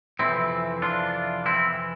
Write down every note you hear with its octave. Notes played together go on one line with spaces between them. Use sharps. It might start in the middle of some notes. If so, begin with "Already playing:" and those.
F2 C3 E3 C4 E4
D4 F4
C4 E4